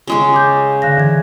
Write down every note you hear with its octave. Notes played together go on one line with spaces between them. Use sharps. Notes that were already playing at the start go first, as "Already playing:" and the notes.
C#3 G#3 C#4
D6 G6
D3 F5 A#6
E3 G#6